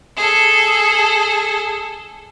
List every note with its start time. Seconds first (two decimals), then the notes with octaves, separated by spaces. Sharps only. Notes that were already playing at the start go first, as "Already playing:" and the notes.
0.17 G#4 A4